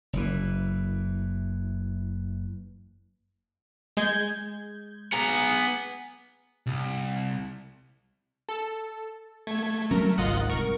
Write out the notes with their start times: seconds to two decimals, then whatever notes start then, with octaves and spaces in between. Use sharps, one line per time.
0.13 F#1 E3
3.97 G#3 G6 G#6
5.12 B3 G#4 A#5
6.67 C2
8.49 A4
9.47 A3 G#6
9.91 F#3 G3 C#4 A#4
10.18 G#1 C#2 G#2 F4 D#5 F#5
10.50 F1 C2 A#4 C#6